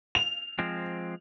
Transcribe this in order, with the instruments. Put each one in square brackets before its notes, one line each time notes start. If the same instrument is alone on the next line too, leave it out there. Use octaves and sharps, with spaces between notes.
[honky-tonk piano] F7
[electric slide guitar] F3 G#3 C4